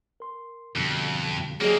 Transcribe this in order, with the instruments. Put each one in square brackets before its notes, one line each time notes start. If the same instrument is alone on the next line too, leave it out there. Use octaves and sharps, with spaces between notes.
[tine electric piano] A#4 C6
[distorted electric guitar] F2 [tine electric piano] B2 D3 G3
[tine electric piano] F#3 G3 D#5 [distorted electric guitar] A#3 C4 [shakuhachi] G#4